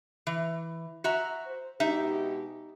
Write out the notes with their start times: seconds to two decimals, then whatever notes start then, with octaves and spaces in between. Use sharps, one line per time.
0.27 E3
1.04 F#4 E5 A#5
1.46 C5
1.80 B2 G#3 D#4 G4 E5